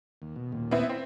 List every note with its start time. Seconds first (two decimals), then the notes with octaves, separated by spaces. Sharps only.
0.22 D#2
0.36 B2
0.52 D#2 A#2
0.71 B3 C4 E4
0.89 C4